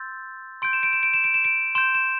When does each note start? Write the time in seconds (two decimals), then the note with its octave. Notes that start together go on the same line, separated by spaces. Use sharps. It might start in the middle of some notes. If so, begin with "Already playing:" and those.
Already playing: C6 E6 G6 A6
0.62 C6 G6 D7
0.73 E7
0.83 D7
0.93 E7
1.03 D7
1.14 E7
1.24 D7
1.34 E7
1.44 D7
1.75 C6 G6 E7
1.95 E7